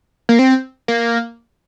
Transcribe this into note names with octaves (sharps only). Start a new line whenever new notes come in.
A#3
C4
A#3